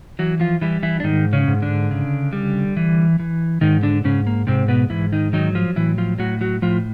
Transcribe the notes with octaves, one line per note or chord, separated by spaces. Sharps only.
E3 F#3 F#4
F3 F4
E3 G3 E4
E3 E4
D4
G#2 D#3 D#4
C#3 C#4
G#2
D3 D4
C#3
G3
E3
E3
G#2 D#3 D#4
D3 D4
G#2 C#3 C#4
A#3
G#2 C3 C4
B2 B3
G#2 E3 E4
D#3 D#4
D#3 F#3 D#4
F3 F4
A2 E3 E4
F3 F4
A2 F#3 F#4
F#3 F#4
A2 F3 F4